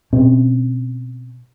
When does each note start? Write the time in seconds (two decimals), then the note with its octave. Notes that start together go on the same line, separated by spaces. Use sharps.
0.13 B2 C4 C#4